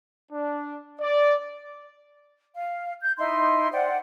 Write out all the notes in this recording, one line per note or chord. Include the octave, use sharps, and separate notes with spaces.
D4
D5
F5
G6
D#4 E4 C6
C5 D5 F#5 G5